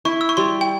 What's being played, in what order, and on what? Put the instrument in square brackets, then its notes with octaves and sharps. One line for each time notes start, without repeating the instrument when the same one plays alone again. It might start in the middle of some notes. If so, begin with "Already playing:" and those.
[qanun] E4 [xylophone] C#6
[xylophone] E6
C#6
[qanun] G3 [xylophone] C6
[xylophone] G5